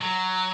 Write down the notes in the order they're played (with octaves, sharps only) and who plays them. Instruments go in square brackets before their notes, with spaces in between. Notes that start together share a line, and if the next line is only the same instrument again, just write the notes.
[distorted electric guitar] F#3